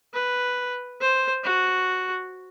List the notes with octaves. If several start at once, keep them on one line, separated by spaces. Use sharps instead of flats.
B4
C5
F#4